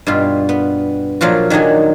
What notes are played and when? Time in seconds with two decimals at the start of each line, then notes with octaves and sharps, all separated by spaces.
0.07 G2 B2 F4
0.49 B3
1.21 A#2 F3 F#3 F4 F#4
1.50 D#3 F#3 D4 D#4 G#4